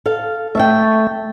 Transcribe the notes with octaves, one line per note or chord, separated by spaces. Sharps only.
A4 F5
A3 E5 F5 G5